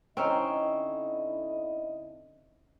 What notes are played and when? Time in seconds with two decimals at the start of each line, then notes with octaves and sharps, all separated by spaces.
0.17 D3 C4 C#4 D#4 E4 D#5